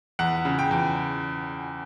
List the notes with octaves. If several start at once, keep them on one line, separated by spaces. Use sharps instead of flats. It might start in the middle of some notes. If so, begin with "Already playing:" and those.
E2 F#5
C#3
G5
E2